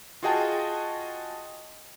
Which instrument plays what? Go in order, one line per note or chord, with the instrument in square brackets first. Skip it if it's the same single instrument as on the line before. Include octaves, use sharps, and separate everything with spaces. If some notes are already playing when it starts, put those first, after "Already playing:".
[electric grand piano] F4 F#4 G#4 D#5 G5 A5